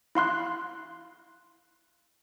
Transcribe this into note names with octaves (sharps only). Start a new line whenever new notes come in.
E4 F5 C6 F#6